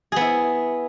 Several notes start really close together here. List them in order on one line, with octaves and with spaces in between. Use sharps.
G#4 B3 E4